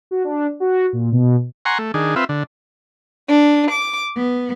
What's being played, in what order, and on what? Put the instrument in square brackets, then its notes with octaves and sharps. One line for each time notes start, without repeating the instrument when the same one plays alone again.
[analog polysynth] F#4
D4
F#4
A#2
B2
[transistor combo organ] F#5 G#5 A#5 C6 C#6
A3
D#3 D4 G#4
C4 F4 B4 E5
D3
[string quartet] D4
D6
B3